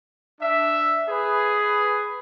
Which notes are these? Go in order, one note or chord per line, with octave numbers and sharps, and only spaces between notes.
D4 E5
G#4 B4